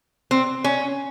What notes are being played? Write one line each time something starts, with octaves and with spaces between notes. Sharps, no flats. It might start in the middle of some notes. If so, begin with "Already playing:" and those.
C4
C#4